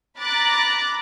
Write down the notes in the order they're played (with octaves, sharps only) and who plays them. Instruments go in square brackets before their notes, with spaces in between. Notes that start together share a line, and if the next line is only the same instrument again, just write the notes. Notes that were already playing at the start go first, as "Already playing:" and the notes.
[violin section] A#5 B5 D6 F#6 A6